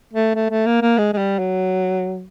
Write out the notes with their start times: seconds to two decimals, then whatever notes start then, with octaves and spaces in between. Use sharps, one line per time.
0.13 A3
0.35 A3
0.50 A3
0.66 A#3
0.82 A#3
0.98 G#3
1.13 G#3
1.18 G3
1.39 F#3